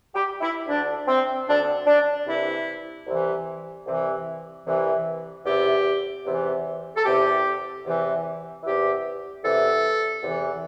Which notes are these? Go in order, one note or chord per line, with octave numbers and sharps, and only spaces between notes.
G4
E4
D2 D3 D4
C4
D2 D3 D4
D4
C2 C3 E3 E4
C2 C3 E3
C2 C3 E3
C2 C3 E3
E2 C3 E3 G4
E2 C3 E3
A4
E2 C3 E3 G4
E2 C3 E3
E2 C3 E3 G4
E2 C3 E3 A4
E2 C3 E3